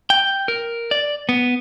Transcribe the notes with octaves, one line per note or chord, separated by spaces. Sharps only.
G5
A#4
D5
B3